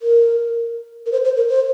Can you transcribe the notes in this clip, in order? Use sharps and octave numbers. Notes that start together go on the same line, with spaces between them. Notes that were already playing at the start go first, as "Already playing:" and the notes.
A#4
A#4
C5
C5
A#4
C5